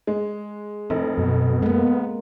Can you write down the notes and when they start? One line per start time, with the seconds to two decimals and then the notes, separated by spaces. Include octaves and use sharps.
0.07 G#3
0.90 F1 A2 C4
1.18 F#2 B2
1.63 G#3 A#3 B3